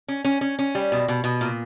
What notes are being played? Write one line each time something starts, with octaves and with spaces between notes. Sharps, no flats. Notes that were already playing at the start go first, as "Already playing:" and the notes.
C#4
C#4
C#4
C#4
G3
B2
B2
B2
A#2